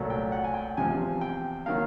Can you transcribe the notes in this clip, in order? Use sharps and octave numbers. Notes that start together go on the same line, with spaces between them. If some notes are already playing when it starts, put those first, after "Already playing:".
Already playing: C2 A#2 F#3 A3
G5
F#5
G#5
G5
E2 C3 F3 G#5
G5
D#3 F#3 A#3 F5